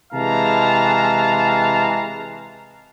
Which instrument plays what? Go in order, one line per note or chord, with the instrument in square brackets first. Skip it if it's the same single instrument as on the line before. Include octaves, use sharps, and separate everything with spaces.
[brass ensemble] C3 E3 G#3 F5 A5 A#5